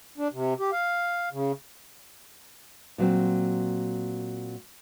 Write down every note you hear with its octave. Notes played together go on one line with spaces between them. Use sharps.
D4
C3
G4
F5
C#3
A#2 F#3 C4